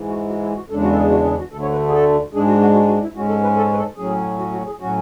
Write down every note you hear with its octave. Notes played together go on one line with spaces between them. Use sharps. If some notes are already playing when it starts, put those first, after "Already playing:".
Already playing: G#2 E3 G#3
F#4
F#4
E4
F#4
E2 C#3 G#3 D4 A4
F#4
A4
G#4
F#4
G#4
F#4
D2 D3 A3 A4
C#5
B4
G#4
A4
G#2 G#3 D4 G#4
F#4
F#4
F#4
F#4
E4
G#2 G#3 C#4 F#4
A4
B4
A4
B4
A4
A2 F#3 C#4 G#4
F#4
F#4
G#4
A2 F#3 C#4 F#4